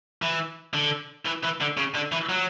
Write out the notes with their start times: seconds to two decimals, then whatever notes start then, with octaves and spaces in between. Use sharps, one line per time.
0.22 E3
0.74 D3
1.25 E3
1.43 E3
1.61 D3
1.77 C#3
1.95 D3
2.12 E3
2.29 F#3